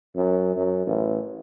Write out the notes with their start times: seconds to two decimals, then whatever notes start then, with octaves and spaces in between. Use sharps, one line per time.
0.16 F#2
0.56 F#2
0.87 A1